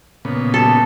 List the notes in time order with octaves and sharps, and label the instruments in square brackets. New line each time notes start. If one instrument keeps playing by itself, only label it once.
[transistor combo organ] A#2 C#3 B3
[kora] A4